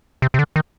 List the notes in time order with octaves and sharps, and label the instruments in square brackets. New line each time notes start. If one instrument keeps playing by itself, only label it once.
[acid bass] C3
C3
D3
D#3